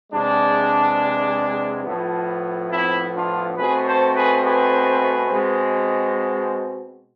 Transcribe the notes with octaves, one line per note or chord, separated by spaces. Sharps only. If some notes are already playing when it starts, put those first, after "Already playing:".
E2 C3 G#3 D4
A2 F3 B3
C4 E4
D4 F4
B2 A3 C4 G#4 B4
A4 C5
G#4 B4
G#4 B4
B2 G#3 C4